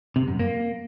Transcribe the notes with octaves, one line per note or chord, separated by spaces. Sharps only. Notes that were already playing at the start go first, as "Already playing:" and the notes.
C3
F#2
A#3